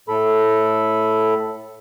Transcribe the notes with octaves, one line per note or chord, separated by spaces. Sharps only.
A2 A4 B5